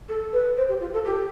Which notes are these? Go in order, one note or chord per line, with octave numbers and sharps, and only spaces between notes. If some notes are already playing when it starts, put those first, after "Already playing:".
A4
B4
C5
G4
F4
A4
G4